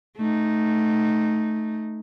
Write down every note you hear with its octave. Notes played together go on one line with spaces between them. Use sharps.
A3 D#4